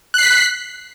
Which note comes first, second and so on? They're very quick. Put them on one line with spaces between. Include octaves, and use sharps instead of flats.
F#6 C7 B6